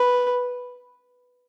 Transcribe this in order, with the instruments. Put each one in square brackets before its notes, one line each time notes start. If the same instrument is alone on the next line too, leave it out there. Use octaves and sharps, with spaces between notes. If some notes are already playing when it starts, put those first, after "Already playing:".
Already playing: [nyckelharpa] B4